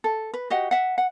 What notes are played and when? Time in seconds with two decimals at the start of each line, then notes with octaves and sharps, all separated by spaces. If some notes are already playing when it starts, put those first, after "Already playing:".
0.04 A4
0.34 B4
0.50 F#4 G4 D#5 F#5
0.71 E5 F#5
0.98 F#5